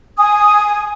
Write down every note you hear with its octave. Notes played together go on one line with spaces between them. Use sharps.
G#5 D#6